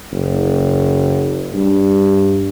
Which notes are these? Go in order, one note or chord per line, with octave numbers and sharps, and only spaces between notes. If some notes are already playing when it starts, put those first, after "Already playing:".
F#1
G2